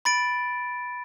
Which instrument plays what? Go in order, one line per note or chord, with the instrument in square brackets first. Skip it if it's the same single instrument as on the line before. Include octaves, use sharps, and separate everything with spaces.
[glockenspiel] B5 A6 D7